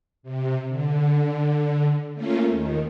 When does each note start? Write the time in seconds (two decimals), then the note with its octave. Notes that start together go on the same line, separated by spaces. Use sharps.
0.23 C3
0.68 D3
2.14 A3 A#3 C#4 F4
2.49 D#2 D#3